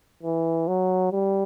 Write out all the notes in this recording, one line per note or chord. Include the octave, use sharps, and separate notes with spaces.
E3
F#3
G3